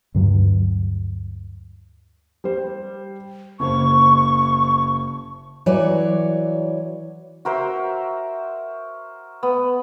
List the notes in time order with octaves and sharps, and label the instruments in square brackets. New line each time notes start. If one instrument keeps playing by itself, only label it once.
[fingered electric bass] D2 G2 F#3
[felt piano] G3 C5
[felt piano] F#1 C5 [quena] C#6
[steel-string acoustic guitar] E3 F#3 C#5 D5
[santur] F#4 A#4 C5 E5
B3